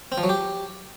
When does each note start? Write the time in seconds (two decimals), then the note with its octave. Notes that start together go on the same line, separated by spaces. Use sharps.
0.12 C4
0.18 F3
0.23 F#3
0.29 G4